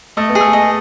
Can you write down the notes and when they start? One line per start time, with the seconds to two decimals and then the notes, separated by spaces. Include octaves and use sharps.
0.17 A3 D#5
0.29 B3
0.35 G#4
0.41 A3
0.53 D#5